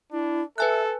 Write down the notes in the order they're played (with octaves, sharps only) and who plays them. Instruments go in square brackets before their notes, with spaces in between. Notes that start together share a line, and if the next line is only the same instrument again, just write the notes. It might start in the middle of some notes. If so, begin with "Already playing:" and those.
[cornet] D4 [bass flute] E4
[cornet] A4 [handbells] B4 G#5 F#6 [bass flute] E5